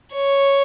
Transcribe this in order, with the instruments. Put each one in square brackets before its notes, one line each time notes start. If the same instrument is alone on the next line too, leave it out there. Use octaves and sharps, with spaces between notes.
[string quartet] C#5